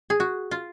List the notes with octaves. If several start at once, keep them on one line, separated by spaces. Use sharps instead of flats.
G#4
F#4
F4